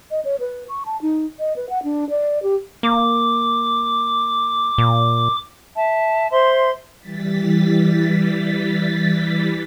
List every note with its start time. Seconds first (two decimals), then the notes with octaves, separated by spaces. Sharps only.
0.11 D#5
0.25 C#5
0.40 B4
0.69 C#6
0.86 A5
1.02 D#4
1.39 D#5
1.56 B4
1.69 F#5
1.83 D4
2.10 D5
2.43 G4
2.83 A#3 D6
4.78 A#2
5.76 E5 A5
6.31 C5 E5 C6
7.00 E3 G3 A6 B6